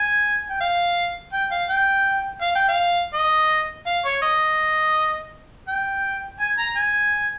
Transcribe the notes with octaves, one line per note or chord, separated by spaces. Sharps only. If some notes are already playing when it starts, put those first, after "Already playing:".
Already playing: G#5
G5
F5
G5
F5
G5
F5
G5
F5
D#5
F5
C#5
D#5
G5
G#5
A#5
G#5